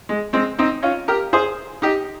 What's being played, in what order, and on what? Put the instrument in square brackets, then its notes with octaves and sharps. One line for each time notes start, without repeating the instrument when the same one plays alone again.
[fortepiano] G#3
G#3 C4
C4 D#4
C#4 F4
G4 A#4
G#4 C5
D#4 G4